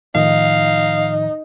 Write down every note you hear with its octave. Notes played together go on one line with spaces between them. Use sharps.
A2 D#3 F3 D#4 F5